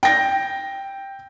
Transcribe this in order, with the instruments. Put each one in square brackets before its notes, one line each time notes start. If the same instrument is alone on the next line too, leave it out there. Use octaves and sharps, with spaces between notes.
[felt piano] G5 A#6